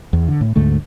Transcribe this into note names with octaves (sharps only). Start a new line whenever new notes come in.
E2
D3
A2
D2 G#2 D3 A3